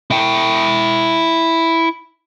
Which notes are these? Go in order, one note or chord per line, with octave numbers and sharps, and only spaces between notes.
E4 G5